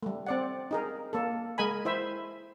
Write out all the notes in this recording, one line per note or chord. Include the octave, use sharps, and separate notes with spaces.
G3 A3
C4 D5 F#5
D#4 G#4 A#4
A#3 A4
G#3 A#4 D#5 G#5 B5
E4 C5 E5